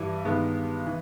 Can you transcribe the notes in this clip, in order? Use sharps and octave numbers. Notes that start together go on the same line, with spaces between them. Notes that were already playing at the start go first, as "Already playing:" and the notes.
Already playing: G2 E3 G3 E4
G2 D#3 G#3 B3
E3